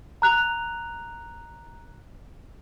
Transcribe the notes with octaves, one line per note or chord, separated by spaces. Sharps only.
A#5 F#6 F7